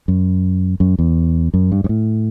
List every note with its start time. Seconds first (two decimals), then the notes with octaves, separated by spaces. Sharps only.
0.08 F#2
0.80 F#2
0.99 E2
1.54 F#2
1.72 G2
1.84 G2
1.89 A2